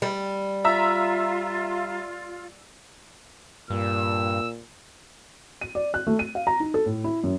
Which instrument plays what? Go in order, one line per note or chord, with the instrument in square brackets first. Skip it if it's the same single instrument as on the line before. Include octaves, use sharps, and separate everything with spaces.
[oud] G3
[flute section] F4 [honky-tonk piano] E5 A#5 E6
[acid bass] G2 [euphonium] A#2 [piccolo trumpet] E6
[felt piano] D#7
D5
F#6
A3
D#7
F5
A#5
D#4
A4
A2
E4
F#2